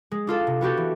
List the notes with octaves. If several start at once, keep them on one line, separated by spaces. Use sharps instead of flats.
G#3
D4 F4 A4
C3
B3 F#4 G4 A4
E3